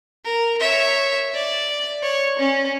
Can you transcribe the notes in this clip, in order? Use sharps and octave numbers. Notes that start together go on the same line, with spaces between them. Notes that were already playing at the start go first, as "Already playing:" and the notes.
A#4
C#5 E5
D5
C#5
C#4